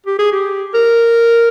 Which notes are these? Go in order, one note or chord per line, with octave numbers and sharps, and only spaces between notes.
G4
G#4
G4
A#4